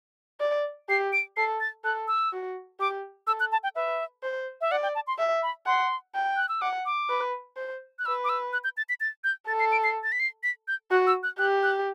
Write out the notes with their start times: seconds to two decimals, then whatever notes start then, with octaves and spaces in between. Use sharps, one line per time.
0.41 D5
0.89 G4 C7
1.13 D7
1.37 A4 C7
1.60 A6
1.84 A4 F#6
2.08 E6
2.33 F#4
2.80 G4 D6
3.27 A4 E6
3.40 F#6
3.52 A5
3.63 G5
3.75 B4 E5
4.23 C5
4.61 E5
4.71 D5 F#5
4.83 G5
4.95 A5
5.07 C6
5.18 E5
5.43 B5
5.66 F#5 C6
6.15 G5
6.37 F#6
6.49 E6
6.61 F#5 D6
6.86 D6
7.09 B4
7.57 C5
7.99 F#6
8.06 B4 E6
8.24 D6
8.29 E6
8.53 F#6
8.64 G6
8.77 A6
8.89 B6
9.00 A6
9.24 G6
9.48 A4 A6
9.60 C7
9.72 D7
9.84 C7
10.04 A6
10.12 B6
10.20 C7
10.43 B6
10.68 G6
10.91 F#4 F#6
11.07 E6
11.23 F#6
11.39 G4 F#6
11.63 F#6